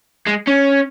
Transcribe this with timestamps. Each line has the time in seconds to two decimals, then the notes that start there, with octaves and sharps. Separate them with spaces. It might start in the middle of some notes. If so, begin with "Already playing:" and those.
0.26 G#3
0.47 C#4